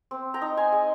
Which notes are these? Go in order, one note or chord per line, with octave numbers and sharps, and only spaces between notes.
C4
G5 A#5
D#4
G#5 C6
G#3